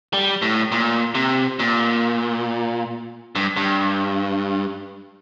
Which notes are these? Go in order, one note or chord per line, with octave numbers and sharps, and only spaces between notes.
G3
A2
A#2
C3
A#2
G2
G2